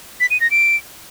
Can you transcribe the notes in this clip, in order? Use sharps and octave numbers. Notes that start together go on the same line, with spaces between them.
B6
D#7
A#6
D7